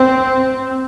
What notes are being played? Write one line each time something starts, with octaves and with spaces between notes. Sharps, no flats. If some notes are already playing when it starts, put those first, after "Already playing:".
Already playing: C4